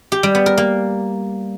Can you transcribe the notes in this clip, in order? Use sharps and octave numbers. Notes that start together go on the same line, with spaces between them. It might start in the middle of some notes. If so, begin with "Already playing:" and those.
G4
G3
B3
A#4
A#3